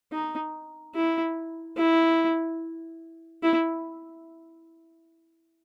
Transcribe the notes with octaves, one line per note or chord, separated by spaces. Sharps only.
D#4
E4
E4
E4